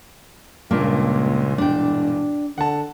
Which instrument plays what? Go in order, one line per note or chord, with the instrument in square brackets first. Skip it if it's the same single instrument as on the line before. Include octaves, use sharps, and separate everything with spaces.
[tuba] C#2 [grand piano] G2 A#2 [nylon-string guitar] A#3
[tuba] E1 [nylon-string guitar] D4 G5
[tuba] D3 [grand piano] F#5 A5